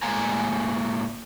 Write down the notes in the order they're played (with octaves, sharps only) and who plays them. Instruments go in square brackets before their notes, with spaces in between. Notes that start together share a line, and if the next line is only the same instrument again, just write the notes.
[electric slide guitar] A2 G#3 A#3 F5 G#5 A#5